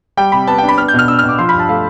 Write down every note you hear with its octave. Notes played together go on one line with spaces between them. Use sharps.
G3 G5
C3 B5
B3 A5
G5
D4
B5
B3 F6
G6
B2 F6
D4 E6
F6
B2
D6
F3 C6
B5
G2
A5
A3 F5